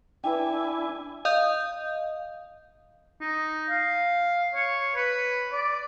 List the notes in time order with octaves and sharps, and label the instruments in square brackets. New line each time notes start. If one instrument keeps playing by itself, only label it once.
[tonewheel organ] D4 G#5 [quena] E4 [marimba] B4 G5
[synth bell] D#5 F5 D#6 G6
[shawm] D#4
F5
C#5
B4
D5